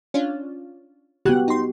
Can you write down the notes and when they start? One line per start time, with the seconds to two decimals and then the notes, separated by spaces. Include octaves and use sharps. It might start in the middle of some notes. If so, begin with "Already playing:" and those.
0.14 C#4 D4 F4
1.25 C#3 B3 F#4 G4 F#5 F#6
1.48 D#4 C6